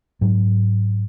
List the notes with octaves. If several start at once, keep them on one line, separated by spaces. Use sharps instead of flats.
G#2 F#3